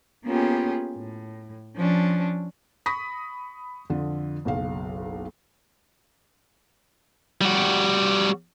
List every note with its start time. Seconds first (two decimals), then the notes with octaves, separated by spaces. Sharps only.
0.25 A#3 B3 C#4 F4 G4 G#4
0.97 A2
1.75 F3 C#4 D4
2.86 B5 C#6 D#6 A#6 B6
3.90 F2 D3 F4
4.45 F#1 B1 F5
7.41 G3 F#4